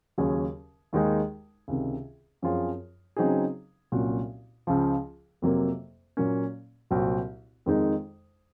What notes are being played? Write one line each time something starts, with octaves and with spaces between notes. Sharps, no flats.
D#2 C#3 F#3 C#4 G#4
D#2 D#3 G#3 D#4 G#4
C#2 C3 D#3
F#2 F3 C4 F4 G#4
C#3 F#3 C4 D#4 G#4
C2 A#2 F#3 C#4 F#4
C#2 C#3 F3
F2 C3 F#3 A#3
A#2 F#3 A#3 C#4
C2 A#2 F#3 C4 F#4
F2 D#3 G#3 D#4 G#4